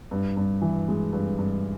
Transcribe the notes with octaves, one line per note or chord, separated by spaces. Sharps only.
G2
G2
E3
G#3
G2
G2